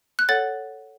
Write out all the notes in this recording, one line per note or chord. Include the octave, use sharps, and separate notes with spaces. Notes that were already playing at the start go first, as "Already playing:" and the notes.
F#6
A4 C#5 F#5 A6